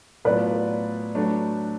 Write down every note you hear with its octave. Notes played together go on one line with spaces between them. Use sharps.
A2 F#3 B3 F4 B4 D5
F#3 A3 D4